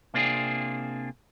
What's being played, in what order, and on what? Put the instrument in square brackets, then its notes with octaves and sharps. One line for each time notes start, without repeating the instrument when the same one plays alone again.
[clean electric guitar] C3 A#3 C4 D4 F4 G#4